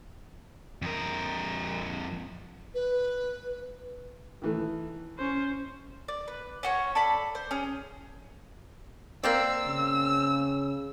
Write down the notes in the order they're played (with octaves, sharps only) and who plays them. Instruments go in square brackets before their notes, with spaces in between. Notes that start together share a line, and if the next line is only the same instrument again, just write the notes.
[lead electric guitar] F2 A#4
[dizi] B4
[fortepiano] D#3 E3 A3
[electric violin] C#4 C5
[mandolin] D5
B4
C#4 F#4 C#5
A4 D5 B5
C5
C#4 G#4
[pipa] A#3 C4 D5 [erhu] E6
[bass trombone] C#3